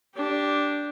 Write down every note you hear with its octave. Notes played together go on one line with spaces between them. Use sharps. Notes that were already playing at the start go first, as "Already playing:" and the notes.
D4 G4